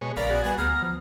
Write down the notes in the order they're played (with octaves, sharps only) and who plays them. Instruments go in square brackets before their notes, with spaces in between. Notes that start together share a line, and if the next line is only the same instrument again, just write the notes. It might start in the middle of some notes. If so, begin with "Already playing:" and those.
[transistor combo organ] B2 G#3 C#5
[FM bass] A#1 [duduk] C#3 [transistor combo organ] A#4 F5 B5 [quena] D5
[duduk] B3 [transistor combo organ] F#4 G#4
[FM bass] G3 [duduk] B4 [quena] G#5
[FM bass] D2 [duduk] B3 [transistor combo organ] A#5 [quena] F6
[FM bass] F3